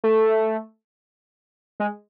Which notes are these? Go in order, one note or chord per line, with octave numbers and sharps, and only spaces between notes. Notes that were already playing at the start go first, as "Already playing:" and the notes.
A3
G#3